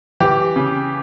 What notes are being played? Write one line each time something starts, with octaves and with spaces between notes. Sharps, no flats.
E3 G4
C#3